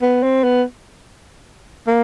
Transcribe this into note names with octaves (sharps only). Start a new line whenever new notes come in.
B3
C4
B3
A#3